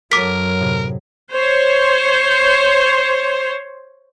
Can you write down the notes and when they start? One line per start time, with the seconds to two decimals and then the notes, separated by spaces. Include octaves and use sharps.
0.12 F#2 F#3 A4 A#4 D6 B6 D#7
0.60 A2 C3
1.32 C5 C#5